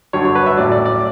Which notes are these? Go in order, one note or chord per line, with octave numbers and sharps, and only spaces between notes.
G2 D3 F#3 C#5
C#5
B4
E5
A1 A2 F#3 D5
D5
D5